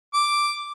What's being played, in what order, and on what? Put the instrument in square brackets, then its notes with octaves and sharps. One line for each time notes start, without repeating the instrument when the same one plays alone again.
[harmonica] D6